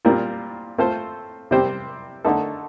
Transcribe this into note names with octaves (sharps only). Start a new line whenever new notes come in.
A#2 G3 C4 F4 A#4
A3 C4 F4 A4 C5
C3 G3 C4 G4 C5
D3 A3 D#4 A4